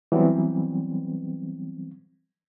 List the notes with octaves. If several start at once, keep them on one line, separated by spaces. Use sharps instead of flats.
E3 F#3 G3 B3 C4